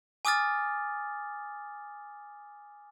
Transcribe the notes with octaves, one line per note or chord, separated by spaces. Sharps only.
G#5 D6 D#6 F6 A6